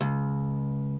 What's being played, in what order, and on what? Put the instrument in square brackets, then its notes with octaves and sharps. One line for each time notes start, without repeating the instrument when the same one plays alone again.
[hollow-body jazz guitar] C#2